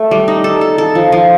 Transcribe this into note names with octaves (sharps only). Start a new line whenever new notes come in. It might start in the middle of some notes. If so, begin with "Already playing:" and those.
Already playing: A3
G3
D#4
A4
A4
A4
F3
F3